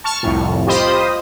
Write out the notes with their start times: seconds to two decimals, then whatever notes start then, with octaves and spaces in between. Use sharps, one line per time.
0.04 A5 C#6 F6
0.23 C2 F2 A2
0.67 F4 G4 C5 D#5 B5 D#6